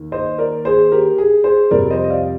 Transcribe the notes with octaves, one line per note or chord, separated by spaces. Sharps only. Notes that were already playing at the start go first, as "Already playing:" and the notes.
Already playing: D#2
C5 D#5
A#4 D5
G#4 C5
G4 A#4
G#4
G#4 C5
F2 C3 G3 C4 A#4 D5
C5 D#5
D#5
D5 F5